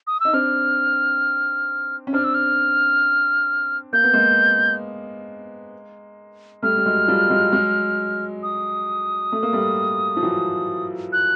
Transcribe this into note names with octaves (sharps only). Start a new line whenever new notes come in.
D#6
D#4 E6
C4 D4 F6
C#4
C4 D4 F6
E6
F6
A#3 G6
B3
G#3 A#3
G3 A3 F6
G3
F#3 G#3
F3 G3
F#3 G#3
F#3 G#3
D#6
A3
A#3
G3 A3
F3
E3 F#3
F#6